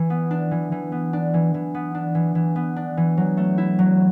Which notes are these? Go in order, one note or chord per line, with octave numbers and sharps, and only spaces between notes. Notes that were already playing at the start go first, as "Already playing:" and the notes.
Already playing: E3
B3
D4
E3
E3
B3
D4
E3
E3
B3
D4
E3
E3
B3
D4
E3
F#3
A3
E4
F#3